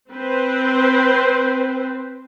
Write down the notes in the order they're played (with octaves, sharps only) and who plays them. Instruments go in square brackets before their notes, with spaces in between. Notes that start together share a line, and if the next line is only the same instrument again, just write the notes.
[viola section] C4 B4 C5